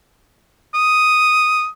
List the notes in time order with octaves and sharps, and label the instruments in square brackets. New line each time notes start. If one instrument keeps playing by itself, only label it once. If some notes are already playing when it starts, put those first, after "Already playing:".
[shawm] D#6